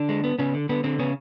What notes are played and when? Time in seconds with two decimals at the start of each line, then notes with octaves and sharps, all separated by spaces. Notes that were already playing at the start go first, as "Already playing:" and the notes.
Already playing: D3 D4
0.09 G#3
0.24 B3
0.39 C#3 B3 C#4
0.54 D3
0.69 D3 B3
0.84 D3 C4
0.99 C#3 B3 C#4